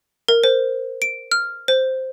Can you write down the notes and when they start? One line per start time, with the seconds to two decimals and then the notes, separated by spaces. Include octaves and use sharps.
0.28 A#4
0.44 C5
1.02 D7
1.32 F6
1.68 C5